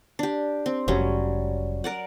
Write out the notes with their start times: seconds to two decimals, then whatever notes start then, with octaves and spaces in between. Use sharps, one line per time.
0.19 D4 G4
0.66 C4
0.88 F1 F#3 G3 C#4
1.84 A#4 D5 F#5